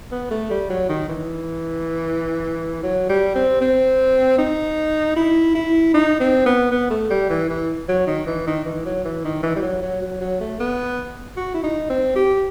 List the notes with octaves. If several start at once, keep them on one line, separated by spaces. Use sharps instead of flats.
B3
A3
G3
F#3
D#3
E3
F#3
G3
C4
C4
D#4
E4
E4
D#4
C4
B3
B3
A3
G3
E3
E3
F#3
D#3
E3
D#3
E3
F#3
E3
D#3
E3
G3
F#3
F#3
F#3
F#3
A3
B3
F#4
E4
D#4
C4
G4